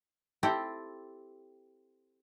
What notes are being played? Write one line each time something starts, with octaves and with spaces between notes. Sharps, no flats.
C4 E4 G4 A4 G5